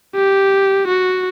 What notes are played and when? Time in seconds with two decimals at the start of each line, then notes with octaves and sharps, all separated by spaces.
0.16 G4
0.88 F#4